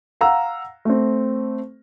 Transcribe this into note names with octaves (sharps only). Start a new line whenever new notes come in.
F5 F#5 A#5 E6
A3 C4